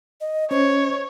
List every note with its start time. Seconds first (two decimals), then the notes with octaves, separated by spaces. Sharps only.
0.21 D#5
0.51 C#4 C5 C#5